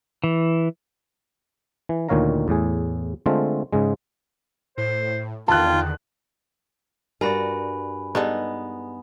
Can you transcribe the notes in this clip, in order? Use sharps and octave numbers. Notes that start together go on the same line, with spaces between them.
E3
E3
D2 A#2 D#3 C#5 F5 A#5
E2 A2 G#4
D3 G#3 A3 C4 F4
G#2 C#3 G#3
A2 C5
E2 D3 D#3 F4 G5 A5 F#6
G2 F#4 A#4 D5 G#5 B5
G3 G#3 B3 D#4 A4